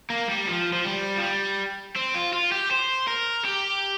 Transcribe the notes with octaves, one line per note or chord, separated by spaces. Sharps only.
A#3
G3
F3
F3
G3
F3
G3
C4
F4
F4
G4
C5
A#4
G4